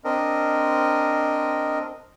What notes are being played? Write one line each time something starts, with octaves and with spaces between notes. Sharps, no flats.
C4 D4 A#4 D#5